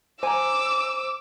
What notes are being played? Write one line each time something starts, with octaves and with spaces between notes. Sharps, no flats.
C5 G#5 A#5 D6 E6